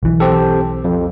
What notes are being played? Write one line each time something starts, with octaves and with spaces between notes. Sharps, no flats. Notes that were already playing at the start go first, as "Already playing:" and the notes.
B1 E3
C4 G4 A4
F2